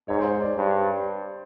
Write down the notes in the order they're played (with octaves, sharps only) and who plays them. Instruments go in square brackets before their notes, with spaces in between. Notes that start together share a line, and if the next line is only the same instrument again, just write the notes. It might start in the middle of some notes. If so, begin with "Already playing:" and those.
[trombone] G#2 [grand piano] C#5
[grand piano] C5
C#5
D5
[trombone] G2